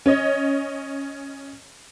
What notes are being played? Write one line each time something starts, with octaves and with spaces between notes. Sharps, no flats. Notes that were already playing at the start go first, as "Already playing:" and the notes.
C#4 C#5 D#5